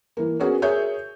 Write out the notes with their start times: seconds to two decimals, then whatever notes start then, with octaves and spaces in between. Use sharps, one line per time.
0.17 E3 A#3
0.40 B3 C#4 F#4 G#4 A#4 C#5
0.62 G#4 A#4 C#5 E5 G6